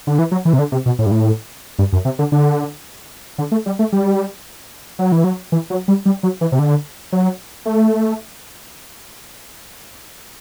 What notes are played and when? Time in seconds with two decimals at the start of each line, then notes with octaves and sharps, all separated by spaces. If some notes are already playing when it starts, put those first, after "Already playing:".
0.07 D3
0.19 E3
0.31 F#3
0.45 E3
0.53 C3
0.59 D3
0.72 C3
0.86 B2
0.99 A2
1.06 G2
1.11 A2
1.79 G2
1.92 F#2
2.05 C3
2.19 D3
2.32 D3
3.38 D3
3.52 A3
3.66 G3
3.79 A3
3.92 G3
4.99 F#3
5.12 E3
5.24 F#3
5.52 E3
5.70 F#3
5.88 G3
6.06 G3
6.23 F#3
6.41 E3
6.52 C3
6.59 D3
7.12 F#3
7.65 A3